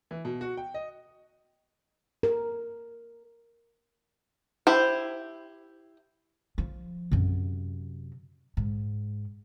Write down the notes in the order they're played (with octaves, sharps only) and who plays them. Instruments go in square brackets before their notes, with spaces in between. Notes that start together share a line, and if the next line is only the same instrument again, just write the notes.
[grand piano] E3
B2
F#4
G5
D#5
[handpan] A#4
[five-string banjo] E4 G4 C5
[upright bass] F3
F#2 C3
G#2